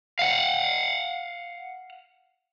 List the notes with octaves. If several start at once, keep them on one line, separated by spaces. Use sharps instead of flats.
F5 F#5